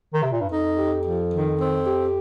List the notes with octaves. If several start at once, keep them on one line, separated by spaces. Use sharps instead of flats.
D#3
C3
A#2
G2
F2 D#4
G4
F3
D#3
C4
G4